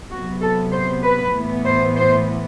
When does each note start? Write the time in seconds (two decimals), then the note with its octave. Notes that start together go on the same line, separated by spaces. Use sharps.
0.10 C3 F#3 B3 F#4
0.41 A4
0.72 C5
1.03 B4
1.34 A2 E3 B3
1.65 C5
1.95 C5